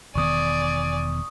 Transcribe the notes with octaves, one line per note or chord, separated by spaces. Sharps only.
E1 D#3 B3 D5 G#5 C#6 D#6